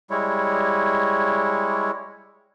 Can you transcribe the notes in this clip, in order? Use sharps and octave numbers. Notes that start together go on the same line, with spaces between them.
G3 G#3 E4 C#5